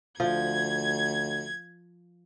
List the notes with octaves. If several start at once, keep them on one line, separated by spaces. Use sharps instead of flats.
D2 F3 G#6